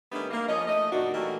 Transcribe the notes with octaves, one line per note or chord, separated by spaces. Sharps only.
D#3 G3 A3 B3 C#4 D4
A#3
F3 C#4 D#5
A3 D#5
F#2 A#2 D#3 D4 D#4 F#4
E3 F#3 G3 A3 A#3 F#4